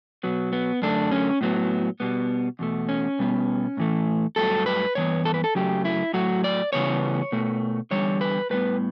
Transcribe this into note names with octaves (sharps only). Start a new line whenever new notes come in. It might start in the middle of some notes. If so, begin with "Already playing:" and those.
B2 F#3 B3
B3
F#2 D3 A3 D4
C#4
A2 F#3 B3
B2 G3 B3
E2 B2 A3
C#4
B2 G3 B3
A2 E3 A3
G2 F#3 A3 A4
B4
G2 E3 B3 C#5
A4
B4
A4
F#2 C#3 F#3 A3 G4
E4
A2 F#3 A3 F#4
D5
C#3 E3 G3 B3 C#5
B2 A3
E2 D3 G3 C#5
B4
A2 G3 B3 B4